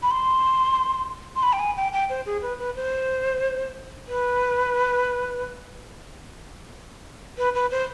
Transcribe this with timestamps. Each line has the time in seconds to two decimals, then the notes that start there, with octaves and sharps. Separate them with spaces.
0.03 B5
0.11 C6
1.36 C6
1.43 B5
1.53 G5
1.59 G#5
1.77 G5
1.93 G5
2.10 C5
2.26 G#4
2.42 B4
2.59 B4
2.76 C5
4.08 B4
7.38 B4
7.55 B4
7.71 C5